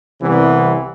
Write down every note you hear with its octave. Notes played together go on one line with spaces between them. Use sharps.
C2 C3 E3 G3 B3